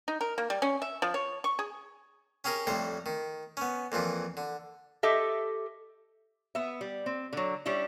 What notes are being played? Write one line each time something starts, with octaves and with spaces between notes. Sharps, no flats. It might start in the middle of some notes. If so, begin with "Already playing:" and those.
D#4
A#4
A#3
G3
C#4
E5
F3
C#5
C#6
G#4
C#4 G4 G#4 A#4
F2 A2 G3 C5
D#3
B3 C#4
F2 A#2 E3 F3
D3
G4 A4 D#5 E5
B3 E5
G3
C4
D3 F#3
G3 C#4 D4 E4